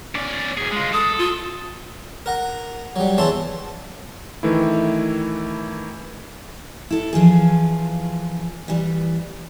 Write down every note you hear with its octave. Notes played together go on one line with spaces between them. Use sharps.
C#4 D5
B2 G#4
G#3 F4
A4 D#6
F4
A#4 F#5 A#5
F#3 G3
E2 E3 C#4 E4 A5 C6
D#3 E3 A3 E4
E4 A4
E3 F3 F4 G#4
E3 G3